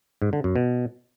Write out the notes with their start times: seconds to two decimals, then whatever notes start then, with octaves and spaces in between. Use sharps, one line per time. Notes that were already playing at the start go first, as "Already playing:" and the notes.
0.22 G#2
0.33 D3
0.44 F#2
0.56 B2